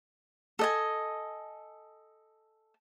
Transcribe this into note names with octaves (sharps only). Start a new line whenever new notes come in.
A4 D#5 G#5